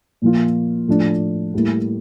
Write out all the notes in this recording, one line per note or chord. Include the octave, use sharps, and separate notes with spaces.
A#2 F3 A#3 F4
A2 F3 A3 D4
A2 G3 A#3 E4